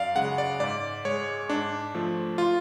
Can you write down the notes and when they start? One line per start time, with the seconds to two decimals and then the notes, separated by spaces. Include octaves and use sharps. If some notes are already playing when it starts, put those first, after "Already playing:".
Already playing: F#2 D5 F5
0.15 C#3 G#3 F#5
0.38 D5
0.60 G#2 D5
1.05 G#3 C#5
1.49 G#2 D4
1.95 F3 A3
2.38 F4